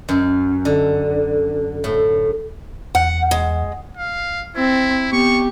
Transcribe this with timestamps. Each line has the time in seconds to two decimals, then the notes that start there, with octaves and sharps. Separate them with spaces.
0.09 F#2
0.65 D3
1.84 A2
2.95 E2 F#5
3.31 G#3
3.97 F5
4.56 C4 E4
5.13 B3 G4 C#6